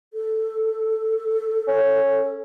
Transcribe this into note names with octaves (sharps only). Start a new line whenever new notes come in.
A4
C#4